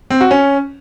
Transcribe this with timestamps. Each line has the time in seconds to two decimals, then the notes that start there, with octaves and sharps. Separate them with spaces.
0.10 C4
0.21 F#4
0.31 C#4